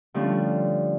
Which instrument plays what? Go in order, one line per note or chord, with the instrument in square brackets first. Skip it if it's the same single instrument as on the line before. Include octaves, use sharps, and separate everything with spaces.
[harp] D3 F3 G3 A3 C#4